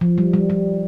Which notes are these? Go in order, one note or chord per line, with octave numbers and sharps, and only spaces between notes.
F3
G3
G3
G3